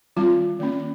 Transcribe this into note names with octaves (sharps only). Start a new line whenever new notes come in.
D#3 G3 C4 F4
D#3 A#3 C#4